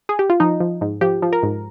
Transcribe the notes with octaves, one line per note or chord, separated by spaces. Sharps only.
G#4
G4
F4
F3 D#4
F3
G#2
F3 G4
F3
A#4
G#2